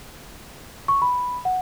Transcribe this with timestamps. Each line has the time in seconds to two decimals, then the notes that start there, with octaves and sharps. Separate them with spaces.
0.88 C#6
1.02 B5
1.45 F#5